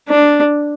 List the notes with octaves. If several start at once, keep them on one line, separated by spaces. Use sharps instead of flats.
D4